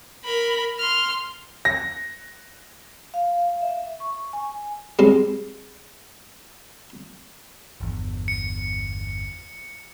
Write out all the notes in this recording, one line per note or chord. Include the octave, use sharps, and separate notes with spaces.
A#4 B5
C6 F6
A#6
F5
F5
E5
C#6
G#5
G3 G#3 C4
G1 E2
C#7